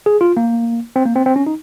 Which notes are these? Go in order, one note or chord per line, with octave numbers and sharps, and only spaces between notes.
G#4
F4
A#3
C4
A#3
C4
C4
C#4
D#4